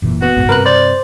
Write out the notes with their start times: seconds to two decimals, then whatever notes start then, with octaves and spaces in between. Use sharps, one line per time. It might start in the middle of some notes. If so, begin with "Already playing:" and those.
0.02 F#1 A#2 E3
0.22 B3 F#4
0.36 F#1 B1 G#2
0.49 G2 C3 A#4 B4 F#6
0.66 C5 D5